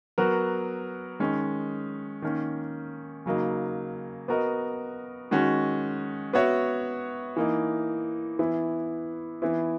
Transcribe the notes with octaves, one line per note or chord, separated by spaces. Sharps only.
F#3 B3 F#4 A#4
D#3 G#3 C#4
D#3 A#3 C#4
C#3 F#3 A#3 D#4
B3 F#4 A#4 D#5
D#3 G#3 C#4 F#4
B3 F#4 C#5 E5
E3 A#3 D#4
E3 B3 E4
E3 B3 E4